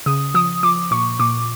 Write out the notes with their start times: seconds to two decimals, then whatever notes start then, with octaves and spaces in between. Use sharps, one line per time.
0.06 C#3 D#6
0.34 F3 D#6
0.63 F3 D6
0.91 A#2 C#6
1.19 A#2 D6